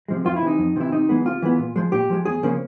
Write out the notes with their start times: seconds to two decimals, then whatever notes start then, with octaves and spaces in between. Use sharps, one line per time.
0.08 C3 F3 G#3
0.25 F2 F4
0.36 E4
0.42 C3 E3 D#4
0.58 F2
0.76 C3 E3 E4
0.92 C3 D#4
1.09 E3 G#3 B3
1.25 C3 F4
1.42 E3 G#3 B3
1.59 A#2
1.76 F3 G#3
1.92 A#2 G4
2.10 F3 G#3
2.25 E2 G#4
2.43 C#3 F3 A#3 C#4